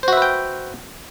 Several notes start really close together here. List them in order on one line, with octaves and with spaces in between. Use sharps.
C5 F#4 E5 B4 G5